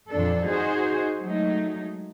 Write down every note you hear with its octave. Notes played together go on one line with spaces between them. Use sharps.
F2 A#2 D4 A4
D#4 F#4 G#4 C5
F#3 G#3 A3 D#4